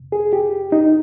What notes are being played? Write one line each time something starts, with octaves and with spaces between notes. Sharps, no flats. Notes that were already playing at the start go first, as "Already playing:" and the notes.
Already playing: F2 C3
G#4
G4
D#4